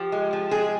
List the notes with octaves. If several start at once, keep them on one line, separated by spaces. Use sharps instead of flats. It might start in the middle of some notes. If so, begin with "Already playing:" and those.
Already playing: F3 G4
G#3
F3
G#3 G#4